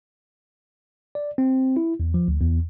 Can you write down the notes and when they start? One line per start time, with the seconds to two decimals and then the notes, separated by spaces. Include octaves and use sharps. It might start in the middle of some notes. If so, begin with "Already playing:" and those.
1.15 D5
1.38 C4
1.77 E4
2.00 E2
2.14 F3
2.28 D2
2.40 E2